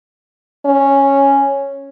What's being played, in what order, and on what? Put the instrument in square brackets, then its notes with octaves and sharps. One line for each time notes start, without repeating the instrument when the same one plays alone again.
[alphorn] C#4